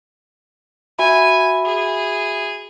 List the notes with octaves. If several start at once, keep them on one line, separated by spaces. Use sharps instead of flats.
F#4 E5 G#5 B5
G#4